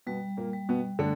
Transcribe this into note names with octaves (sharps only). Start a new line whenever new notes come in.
B2 G3 B3
A#2 A#3
G3
B2 B3
D3 A3 D4